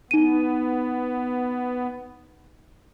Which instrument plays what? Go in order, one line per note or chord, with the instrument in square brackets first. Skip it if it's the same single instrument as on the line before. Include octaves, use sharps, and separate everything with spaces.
[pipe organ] B3 [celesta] D#4 D#7